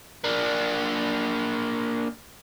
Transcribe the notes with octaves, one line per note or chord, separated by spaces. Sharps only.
A#3 D4